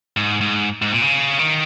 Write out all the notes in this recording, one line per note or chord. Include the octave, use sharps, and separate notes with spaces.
G#2
G#2
G#2
A#2
C#3
D#3